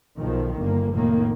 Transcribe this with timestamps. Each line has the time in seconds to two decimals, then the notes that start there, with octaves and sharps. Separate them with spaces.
0.17 B1 D#3 F3
0.58 G1 A#3
0.95 F1 A2 D#3 A#3